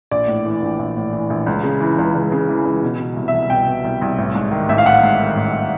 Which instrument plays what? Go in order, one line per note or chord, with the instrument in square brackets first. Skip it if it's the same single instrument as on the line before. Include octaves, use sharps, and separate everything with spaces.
[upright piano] A#1 D5
A2
E3
A#1
A#1
A2
E3
A#1
C#2
C#3
E3
C#2
C#2
C#3
E3
C#2
B2
B2
C2
E5
C2
B2 G5
B2
C2
C2
A1
G#2
D#3
A1 E5
F5
A1 F#5
G#2
D#3
A1